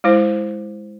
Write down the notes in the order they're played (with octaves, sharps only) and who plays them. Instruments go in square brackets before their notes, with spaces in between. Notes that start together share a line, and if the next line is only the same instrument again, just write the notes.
[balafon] G#3 E4 C5